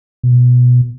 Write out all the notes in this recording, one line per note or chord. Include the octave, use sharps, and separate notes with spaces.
B2